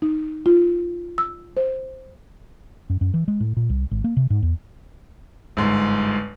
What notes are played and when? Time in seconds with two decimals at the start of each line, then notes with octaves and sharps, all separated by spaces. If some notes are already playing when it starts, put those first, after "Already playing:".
0.02 D#4
0.46 F4
1.18 E6
1.57 C5
2.90 F#2
3.01 F#2
3.14 E3
3.28 G#3
3.40 A2
3.57 A#2
3.70 C2
3.91 G#1
4.04 A#3
4.17 C3
4.30 G#2
4.43 E2
5.57 G1 G#2